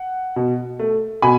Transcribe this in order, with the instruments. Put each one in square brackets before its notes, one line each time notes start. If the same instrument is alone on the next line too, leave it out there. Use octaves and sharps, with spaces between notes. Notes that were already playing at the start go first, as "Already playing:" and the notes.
Already playing: [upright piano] F#5
B2
A3
B2 G#5 B5